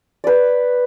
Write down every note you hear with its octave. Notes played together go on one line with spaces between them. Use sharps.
B4 D5